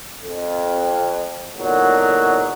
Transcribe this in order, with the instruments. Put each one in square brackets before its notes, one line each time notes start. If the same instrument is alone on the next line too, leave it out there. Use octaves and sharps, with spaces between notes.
[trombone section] F2
E2 A#2 D3 F#3 D#4